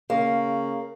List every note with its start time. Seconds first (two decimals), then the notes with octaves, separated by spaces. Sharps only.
0.10 C#3 A#3